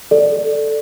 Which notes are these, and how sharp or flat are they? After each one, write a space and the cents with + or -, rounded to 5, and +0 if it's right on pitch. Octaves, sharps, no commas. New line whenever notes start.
A4 +0 D5 +0